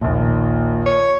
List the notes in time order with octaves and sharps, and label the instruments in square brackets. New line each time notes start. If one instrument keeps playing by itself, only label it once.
[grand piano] A#1 D#2 [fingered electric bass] A#2
[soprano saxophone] C#5